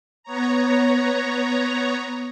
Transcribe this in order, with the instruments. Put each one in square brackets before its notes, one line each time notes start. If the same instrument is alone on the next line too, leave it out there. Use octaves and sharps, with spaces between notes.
[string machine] B3 C#5 A#5